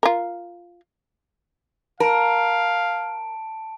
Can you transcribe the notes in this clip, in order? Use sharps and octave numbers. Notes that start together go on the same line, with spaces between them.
F4 A#4
A#4 F5 A5 D7